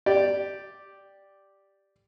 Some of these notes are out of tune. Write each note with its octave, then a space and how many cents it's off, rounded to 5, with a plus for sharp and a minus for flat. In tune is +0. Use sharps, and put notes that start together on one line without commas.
G4 +0 D5 +0